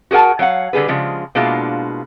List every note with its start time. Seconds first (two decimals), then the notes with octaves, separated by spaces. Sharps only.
0.11 F#4 G#4 A#4 F#5 A5
0.39 F#3 C#5 F5 F#5
0.73 D3 G3 G#4 B4
0.88 C#3 F3 G#3
1.35 B2 G#3 A#3 D4 E4 F4